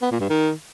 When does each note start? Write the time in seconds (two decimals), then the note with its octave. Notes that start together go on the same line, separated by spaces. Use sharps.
0.02 B3
0.11 A#2
0.20 G2
0.30 D#3